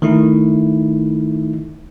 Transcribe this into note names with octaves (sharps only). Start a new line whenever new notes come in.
D#3 A3 D#4 E4